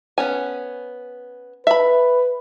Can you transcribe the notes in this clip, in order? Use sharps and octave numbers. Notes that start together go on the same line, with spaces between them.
B3 C#4 G#5
B4 E5 B5